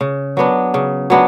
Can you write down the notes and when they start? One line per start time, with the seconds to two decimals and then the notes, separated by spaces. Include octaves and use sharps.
0.01 C#3
0.37 F#3 B3 D4
0.74 C#3
1.10 F#3 B3 D4